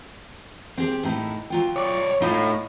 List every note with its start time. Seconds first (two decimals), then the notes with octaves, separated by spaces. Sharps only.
0.77 C4 G4 G#4
1.03 A2 D#4 E4
1.50 F#3 F4 G5
1.76 C#5 D5
2.22 A2 D#4 F4